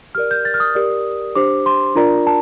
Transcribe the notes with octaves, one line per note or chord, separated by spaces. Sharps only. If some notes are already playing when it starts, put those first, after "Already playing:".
G4 A#4 D5 F6
G6
A6
F6
D#6
G4 A#4 D5
D4 G4 C5 D6
C6
D4 F4 A#4 D5 A#5
A5